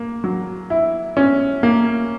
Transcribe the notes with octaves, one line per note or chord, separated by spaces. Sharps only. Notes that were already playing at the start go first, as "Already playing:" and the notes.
Already playing: A#3
F#3
E4
C#4
A#3